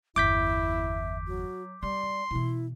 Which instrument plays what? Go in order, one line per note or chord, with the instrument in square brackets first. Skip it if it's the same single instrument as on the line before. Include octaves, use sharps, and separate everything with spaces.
[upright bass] G1 E2 [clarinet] E4 [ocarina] E5 [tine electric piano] D6 G6 B6
[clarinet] F#3 [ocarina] F#4
[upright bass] G3 [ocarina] D5 [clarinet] C6
[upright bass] B2 E3 [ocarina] E4